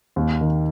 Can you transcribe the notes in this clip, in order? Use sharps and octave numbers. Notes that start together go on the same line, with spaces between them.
D#2
D#3